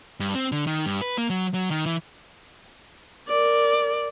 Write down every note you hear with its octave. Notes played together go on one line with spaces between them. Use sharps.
G2
C4
D3
D#3
G2
B4
A#3
F#3
F#3
D#3
E3
A#4 D5